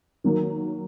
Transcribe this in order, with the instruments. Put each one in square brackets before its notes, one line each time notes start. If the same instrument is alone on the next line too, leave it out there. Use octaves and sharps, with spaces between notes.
[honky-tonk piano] D#3 F#3 A#3